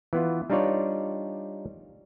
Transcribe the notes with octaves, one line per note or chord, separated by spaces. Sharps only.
E3 B3 F4
G3 D4 D#4 F4 C#5 D5